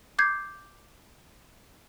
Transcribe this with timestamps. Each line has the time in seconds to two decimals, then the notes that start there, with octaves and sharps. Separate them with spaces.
0.19 D6 G6 G#6 C7